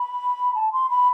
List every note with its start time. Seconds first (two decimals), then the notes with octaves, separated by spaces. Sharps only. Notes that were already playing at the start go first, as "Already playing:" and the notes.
Already playing: B5
0.55 A5
0.72 C6
0.90 B5